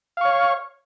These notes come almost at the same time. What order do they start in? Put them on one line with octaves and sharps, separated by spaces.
F5 C#6 C#5